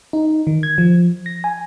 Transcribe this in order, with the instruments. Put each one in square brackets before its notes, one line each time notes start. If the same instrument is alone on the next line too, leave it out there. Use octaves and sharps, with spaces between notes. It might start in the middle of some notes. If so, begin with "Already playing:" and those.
[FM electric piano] D#4
D#3
G#6
F3
A#6
G#5